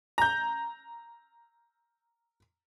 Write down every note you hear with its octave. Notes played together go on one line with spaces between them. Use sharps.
A#5 G6